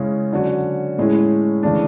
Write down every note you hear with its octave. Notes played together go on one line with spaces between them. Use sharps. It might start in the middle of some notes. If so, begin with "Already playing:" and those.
Already playing: C#3 G#3 C#4 E4
D3 F#3 C#4 F#4
A2 G#3 C#4 E4
C#3 E3 A3 D4